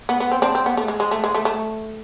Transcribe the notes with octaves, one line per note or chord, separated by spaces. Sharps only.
B3
B3
C4
C4 D4
C4
B3
A3
G#3
G#3
A3
G#3
A3
A3